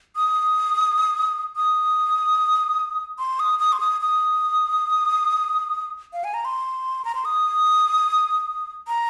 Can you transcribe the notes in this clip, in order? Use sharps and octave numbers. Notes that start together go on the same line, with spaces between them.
D#6
D#6
C6
D#6
D#6
C6
D#6
D#6
F5
G#5
A#5
C6
A#5
C6
D#6
A#5